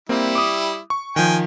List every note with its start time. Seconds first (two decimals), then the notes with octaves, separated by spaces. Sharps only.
0.09 G3 A#3 C4 E4
0.35 D6 D#6
0.90 C#6
1.16 D#3 F3 G5 G#5